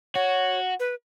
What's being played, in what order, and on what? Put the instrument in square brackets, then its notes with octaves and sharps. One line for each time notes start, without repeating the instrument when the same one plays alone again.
[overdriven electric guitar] F#4 [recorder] C#5
[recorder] B4